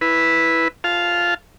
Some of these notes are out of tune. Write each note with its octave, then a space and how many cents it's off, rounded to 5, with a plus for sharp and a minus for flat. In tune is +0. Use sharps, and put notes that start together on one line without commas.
E4 +0 B4 +0
F4 +0 F5 +0 A5 -15